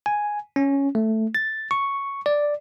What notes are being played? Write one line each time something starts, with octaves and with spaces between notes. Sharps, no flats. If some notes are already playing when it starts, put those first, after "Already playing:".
G#5
C#4
A3
A6
C#6
D5